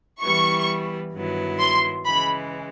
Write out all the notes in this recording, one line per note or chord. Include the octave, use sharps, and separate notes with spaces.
E3 G3 B3 E4 C#6
G2 D#3 F#3 B3 E4
C6
C#3 E3 G#3 B5